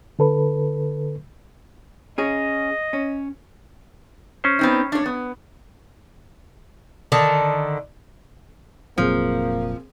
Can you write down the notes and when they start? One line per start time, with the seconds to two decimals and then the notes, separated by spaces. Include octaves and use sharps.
0.19 D3 A4 B4
2.18 C#4 G#4 D#5
2.93 C#4
4.44 C#4 C5
4.59 B3 C4 D#4
4.92 D4 C#5
5.06 B3
7.12 D3 D#3 A5
8.98 F1 A#2 F3 F#3 A#3 C4 G#4